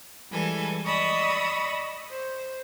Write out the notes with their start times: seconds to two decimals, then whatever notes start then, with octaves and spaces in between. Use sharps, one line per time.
0.30 E3 G3 G#3 A4 G#5
0.84 D5 D#5 B5 C#6 D#6 E6
2.10 C5